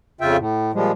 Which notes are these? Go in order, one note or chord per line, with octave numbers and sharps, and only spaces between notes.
F2 C#3 F4 E5 G5
A2
A#2 F3 G3 G#3